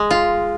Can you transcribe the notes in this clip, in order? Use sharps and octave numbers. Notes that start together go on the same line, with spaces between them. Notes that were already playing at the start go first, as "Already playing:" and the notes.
Already playing: G#3
F4